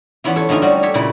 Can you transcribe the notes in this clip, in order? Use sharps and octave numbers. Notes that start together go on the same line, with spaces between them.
E3 B3 C#4 E4 F4
A4 C#5
D3 A3 C4 D#4 F4 G#5
G3 C#4 F#4
G4 A4 C#5 E5
A#2 C#3 A3 E4